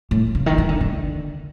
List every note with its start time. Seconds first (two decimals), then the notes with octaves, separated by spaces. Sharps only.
0.11 A2
0.35 C#3
0.46 D#3
0.58 D#3
0.69 D3
0.81 D3